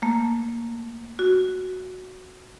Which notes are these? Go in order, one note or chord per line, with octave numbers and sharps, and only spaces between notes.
A3 A#3
F#4